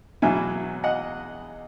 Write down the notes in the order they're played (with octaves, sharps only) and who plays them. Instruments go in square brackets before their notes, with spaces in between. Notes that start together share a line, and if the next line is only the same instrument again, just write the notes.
[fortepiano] E2 B2 F#3 B3 E5 G#5
D#5 F#5